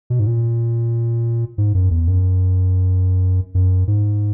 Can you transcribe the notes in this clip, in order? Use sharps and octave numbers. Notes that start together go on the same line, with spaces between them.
B2
G#2
A#2
G#2
F#2
E2
F#2
F#2
G#2